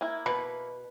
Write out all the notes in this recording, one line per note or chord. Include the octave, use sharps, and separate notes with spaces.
A#3 E4
B2 B4